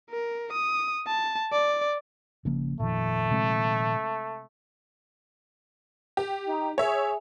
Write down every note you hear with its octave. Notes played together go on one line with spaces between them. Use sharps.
A#4
D#6
A5
D5
G#1 C#3 F3 A#3
G1 F2 A#2 D#3 F3 A3
C3 G#3 C4
G4
D#4
G#4 C#5 E5